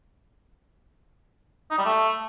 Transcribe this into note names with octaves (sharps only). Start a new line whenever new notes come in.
D#4
G3
A3